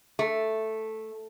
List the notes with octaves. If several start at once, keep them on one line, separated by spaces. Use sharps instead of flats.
A3